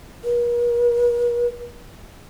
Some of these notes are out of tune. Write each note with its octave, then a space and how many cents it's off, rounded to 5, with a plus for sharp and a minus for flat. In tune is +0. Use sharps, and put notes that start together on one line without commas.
A#4 +45